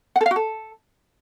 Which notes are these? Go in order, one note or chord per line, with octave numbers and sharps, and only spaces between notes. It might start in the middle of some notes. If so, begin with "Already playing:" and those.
F#5
A4
F5
F#4
A4